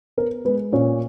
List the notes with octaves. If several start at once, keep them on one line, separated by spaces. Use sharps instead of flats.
B3 A#4
G#3 B3 B4
A#2 C#4 C#5